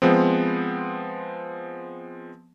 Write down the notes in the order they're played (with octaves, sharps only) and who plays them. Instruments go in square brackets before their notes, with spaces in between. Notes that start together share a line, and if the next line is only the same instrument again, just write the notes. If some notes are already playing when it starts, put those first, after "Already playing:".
[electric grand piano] F3 G#3 B3 C4